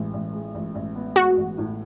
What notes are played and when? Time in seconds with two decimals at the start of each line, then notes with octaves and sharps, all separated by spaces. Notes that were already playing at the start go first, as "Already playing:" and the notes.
Already playing: A1 A2 G#3
0.13 A1
0.33 G#3
0.55 A1
0.75 A1
0.96 B3
1.16 G#3 F#4
1.37 A1
1.58 A2